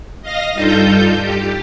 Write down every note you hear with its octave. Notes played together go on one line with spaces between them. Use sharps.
D#5 F5 A#6
G2 G3 D#4 F4 A4 G6
G4